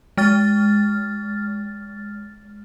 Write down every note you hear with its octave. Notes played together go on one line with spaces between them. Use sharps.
G#3 F6 A6